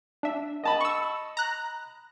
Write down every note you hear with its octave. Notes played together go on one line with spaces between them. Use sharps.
D4 E5
D#5 A5 B5
C#6 E6
A#5 F#6